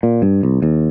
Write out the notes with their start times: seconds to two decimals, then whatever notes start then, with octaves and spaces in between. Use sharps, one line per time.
0.03 A#2
0.22 G2
0.43 C2
0.62 D#2